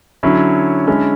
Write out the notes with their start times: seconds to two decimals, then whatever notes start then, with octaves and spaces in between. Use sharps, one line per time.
0.23 D3 F#3 C#4 E4
0.87 D3 G#3 C#4 E4 A4